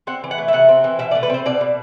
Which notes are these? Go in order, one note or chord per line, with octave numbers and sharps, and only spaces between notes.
C4 F#5
E3
F#5
A3
E5
C3 F#5
C4
E3
B2 E5
D5
A3
B4
C4 C5
B2 D5
B2